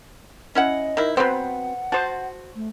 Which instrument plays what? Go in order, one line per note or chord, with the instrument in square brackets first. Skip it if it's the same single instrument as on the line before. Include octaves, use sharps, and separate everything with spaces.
[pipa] C#4 E4 F#5 [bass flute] D#5
[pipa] D#3 E4
[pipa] F#3 B3 C4 [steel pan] B4 C5 [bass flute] F#5
[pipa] F#4 [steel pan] C5 A5
[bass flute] A3